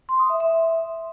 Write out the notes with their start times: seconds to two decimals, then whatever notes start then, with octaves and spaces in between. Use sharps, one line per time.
0.09 C6
0.19 D#6
0.30 E5
0.40 E5